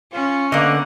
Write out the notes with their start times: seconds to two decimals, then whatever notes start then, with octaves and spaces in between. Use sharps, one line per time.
0.13 C#4 F4
0.52 D3 A#3 B3 D#5 F#5